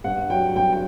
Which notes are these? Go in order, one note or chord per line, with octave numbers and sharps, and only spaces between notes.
G2 F#5
F#3 G5
G2 G5
G5